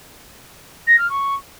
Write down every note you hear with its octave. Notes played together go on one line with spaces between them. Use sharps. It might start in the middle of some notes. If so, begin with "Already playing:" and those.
A#6
F6
C#6